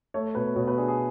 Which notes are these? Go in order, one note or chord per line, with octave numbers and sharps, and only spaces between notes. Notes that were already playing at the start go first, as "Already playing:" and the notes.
A3 C#5
B2 B4
B2 C#5
B4
D4 G#4
G#4